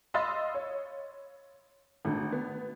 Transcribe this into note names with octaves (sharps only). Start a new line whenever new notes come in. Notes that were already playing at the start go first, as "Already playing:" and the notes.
D#5 F5 B5 C6 E6 A6
C#5
G#1 D3 A3
B3